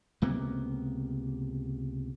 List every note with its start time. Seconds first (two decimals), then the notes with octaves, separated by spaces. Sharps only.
0.22 C#2 C3 A#3 B3